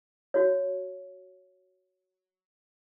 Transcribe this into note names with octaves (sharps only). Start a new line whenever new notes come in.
F#4 C#5